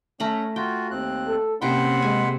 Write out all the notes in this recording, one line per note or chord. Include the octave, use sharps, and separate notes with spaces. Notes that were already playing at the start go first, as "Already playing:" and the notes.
A3 C#4 A#5 B5
F4 F#4 G5
D#2 C4 F#6
A4
C3 A#3 C#4 F#5 G5 B5 C6
G#3 G#5